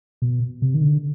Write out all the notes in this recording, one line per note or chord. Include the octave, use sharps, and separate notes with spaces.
B2
C3
D#3
D3